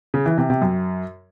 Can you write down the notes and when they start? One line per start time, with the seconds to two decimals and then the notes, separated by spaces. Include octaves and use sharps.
0.14 C#3
0.26 E3
0.38 C3
0.50 C3
0.62 F#2